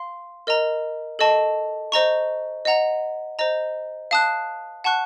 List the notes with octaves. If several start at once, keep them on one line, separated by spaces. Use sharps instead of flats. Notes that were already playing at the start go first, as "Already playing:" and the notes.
Already playing: F5 C6
A#4 D#5 A#5
A4 D#5 A5 C#6
C5 D#5 A#5 C#6
D#5 F#5 A#5
C5 D#5 A#5
F5 A5 D#6 F#6
F#5 A5 C#6 F#6